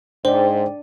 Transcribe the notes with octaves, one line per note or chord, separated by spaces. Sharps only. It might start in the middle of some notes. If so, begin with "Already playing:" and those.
G#2 D4 C5 D5 G5